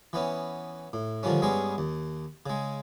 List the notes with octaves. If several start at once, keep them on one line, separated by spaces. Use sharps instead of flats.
E3 B3 C#4
A2
D3 D#3 F3 G3 C#4
G2 G#3 B3 C#4 G#4
D#2
C#3 G#3